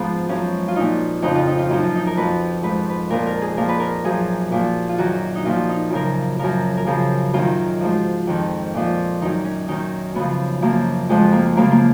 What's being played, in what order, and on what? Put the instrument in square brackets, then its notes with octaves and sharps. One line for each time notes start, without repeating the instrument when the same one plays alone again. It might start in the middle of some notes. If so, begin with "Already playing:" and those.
Already playing: [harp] G#2 F3 B3
F#2 F3 C#4
F4
A#2 F3 D#4
F2 C#3 F3 D#4
F4
D#4
F4
F#2 F3 D#4
F4
D#4
A#4
F2 F3 B4
G#2 F3 B4
B4
A#2 F3 A#4
A#4
G#4
A#2 F3 A#4
B4
A#4
F#2 F3 G#4
A#2 F3
F4
F#2 D#3 F#4
D#4
A#2 F3 F4
D#4
F#2 C#3 F3 A#4
F#2 F3 A#4
A#4
F#2 C#3 F3 G#4
F#2 D#3 F4
G#2 F3
F2 D#3
A#2 F3
F#2 D#3 D#4
C#4
F#2 D#3 D#4
F#2 C#3 F3 B3
F#2 F3 A#3
F2 F3 G#3
A#3
F#2 C#3 F3 A#3
A#3